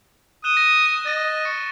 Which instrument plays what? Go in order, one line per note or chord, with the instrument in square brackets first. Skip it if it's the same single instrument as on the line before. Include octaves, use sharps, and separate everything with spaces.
[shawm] D#6 [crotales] F#6 E7 G7
[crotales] A#6
[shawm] D#5 [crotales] A6 D#7
[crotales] C#6 A6 C#7